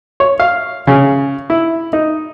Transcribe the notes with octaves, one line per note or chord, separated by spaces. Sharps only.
C#5
F5
C#3
E4
D#4